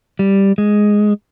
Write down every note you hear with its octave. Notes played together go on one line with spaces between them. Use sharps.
G3
G#3